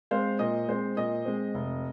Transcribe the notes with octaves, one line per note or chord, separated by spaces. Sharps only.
G#3 C4 C5 F5
A#2 D#5
G#3 C4 C5
A#2 D#5
G#3 C4
F1